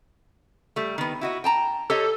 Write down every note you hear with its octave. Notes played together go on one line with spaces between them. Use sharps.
G3 A3
D#3 B3
E4 F#4 D#5
G5 A5 A#5
G4 A4 C#5 D#5